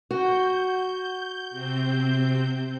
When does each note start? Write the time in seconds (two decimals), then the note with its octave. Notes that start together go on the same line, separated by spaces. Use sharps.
0.11 F#4 G6
1.51 C3 C4 G6